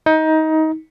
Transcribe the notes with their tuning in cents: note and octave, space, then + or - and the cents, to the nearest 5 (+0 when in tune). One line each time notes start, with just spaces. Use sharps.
D#4 +20